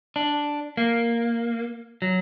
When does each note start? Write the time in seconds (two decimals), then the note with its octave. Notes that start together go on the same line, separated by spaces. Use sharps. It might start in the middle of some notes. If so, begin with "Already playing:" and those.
0.16 D4
0.77 A#3
2.02 F#3